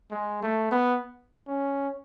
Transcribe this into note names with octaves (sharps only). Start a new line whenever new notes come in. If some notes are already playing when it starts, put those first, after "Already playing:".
G#3
A3
B3
C#4